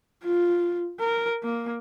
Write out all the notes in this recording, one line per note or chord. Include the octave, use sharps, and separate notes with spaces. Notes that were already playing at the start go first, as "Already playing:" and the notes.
F4
A#4
A#3